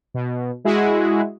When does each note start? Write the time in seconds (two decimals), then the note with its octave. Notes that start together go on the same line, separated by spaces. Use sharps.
0.14 B2
0.65 G#3 E4 F#4 G#4